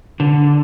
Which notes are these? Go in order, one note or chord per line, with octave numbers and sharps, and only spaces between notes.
D3